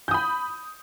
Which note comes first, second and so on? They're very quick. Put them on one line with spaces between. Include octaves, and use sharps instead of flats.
G6 D#6 B5